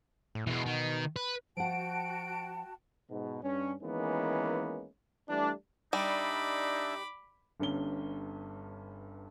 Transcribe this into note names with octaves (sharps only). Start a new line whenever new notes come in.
A2
B2 E3 G#3
D#3
B4
F3 F#4 F#5 G5 A5 D7
G#2 B2
G2 C#4
D#3 E3 G#3 A#3 B3 C#4
E3 G3 A3 D4
G3 D4 D#4 E5 B5 D6
G1 G2 C#4 G7